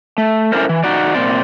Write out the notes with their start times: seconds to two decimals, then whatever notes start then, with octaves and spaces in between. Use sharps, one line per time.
0.18 A3
0.52 C#4 D4 E4 A4 A#4 C5
0.69 E3
0.84 D#4 F#4 D5
1.14 A#2 C4 D5